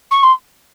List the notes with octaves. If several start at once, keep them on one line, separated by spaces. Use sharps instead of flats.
C#6
C6